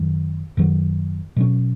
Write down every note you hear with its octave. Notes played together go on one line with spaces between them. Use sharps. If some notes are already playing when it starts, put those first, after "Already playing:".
Already playing: F#2 D#3 F#3
F#2 D#3 F#3
B2 F#3 C#4